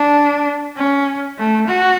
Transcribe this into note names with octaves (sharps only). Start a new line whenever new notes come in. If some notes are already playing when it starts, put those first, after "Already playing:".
Already playing: D4
C#4
A3
F#4